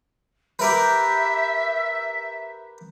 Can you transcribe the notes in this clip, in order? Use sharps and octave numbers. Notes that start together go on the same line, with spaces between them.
G4 A#4 B4 E5